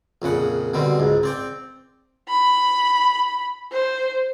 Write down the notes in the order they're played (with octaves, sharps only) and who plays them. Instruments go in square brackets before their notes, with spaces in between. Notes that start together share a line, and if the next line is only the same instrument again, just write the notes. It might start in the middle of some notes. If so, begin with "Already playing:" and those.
[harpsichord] A#1 F2 C#3 F#5
B2 D3 G3 C4
C#2 G#2
C4 D5 G5
[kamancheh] B5
C5